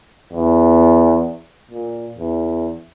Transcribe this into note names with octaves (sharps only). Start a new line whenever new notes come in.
E2
A#2
E2